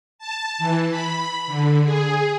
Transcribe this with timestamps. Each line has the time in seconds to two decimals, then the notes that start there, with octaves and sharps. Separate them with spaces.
0.19 A5
0.58 E3
0.89 B5
1.47 D3
1.84 G#4